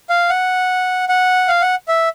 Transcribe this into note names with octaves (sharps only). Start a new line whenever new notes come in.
F5
F#5
F#5
F5
F#5
E5